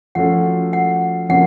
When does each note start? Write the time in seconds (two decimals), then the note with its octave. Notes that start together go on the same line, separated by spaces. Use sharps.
0.15 F3 A3 C#4 F#4 A4 F#5
0.73 F#5
1.29 C3 F3 A#3 C#4 F#5